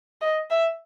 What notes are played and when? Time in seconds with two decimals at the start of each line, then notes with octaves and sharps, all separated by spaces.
0.21 D#5
0.50 E5